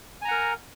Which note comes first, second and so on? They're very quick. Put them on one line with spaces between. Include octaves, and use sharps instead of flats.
G#5 A#5 F#5 A#4